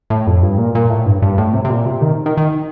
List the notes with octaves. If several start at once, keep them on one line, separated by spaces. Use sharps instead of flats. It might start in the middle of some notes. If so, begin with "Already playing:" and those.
A2
F2
G2
A#2
A#2
A2
G2
G2
A2
C3
C3
A#2
C3
D#3
D#3
D#3